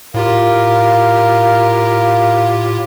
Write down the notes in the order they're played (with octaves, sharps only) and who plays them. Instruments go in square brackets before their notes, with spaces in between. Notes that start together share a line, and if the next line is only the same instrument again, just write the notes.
[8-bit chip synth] A2 F4 G4 [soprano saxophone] A#4 [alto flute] F5